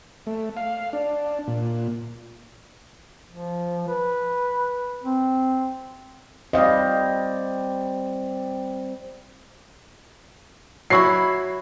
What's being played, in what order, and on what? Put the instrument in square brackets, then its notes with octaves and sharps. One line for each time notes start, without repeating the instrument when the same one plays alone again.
[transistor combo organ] A3
F5
D4
A#2
[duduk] F3
B4
C4
[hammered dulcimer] G3 C4 [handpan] D#5 F5
[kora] F#3 E4 [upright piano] B5 C#6 C7